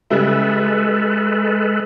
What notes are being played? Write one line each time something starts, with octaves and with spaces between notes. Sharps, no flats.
C#3 G3 G#3 E4 A4 B4